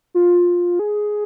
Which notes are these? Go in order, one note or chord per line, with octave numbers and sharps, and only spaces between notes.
F4
G#4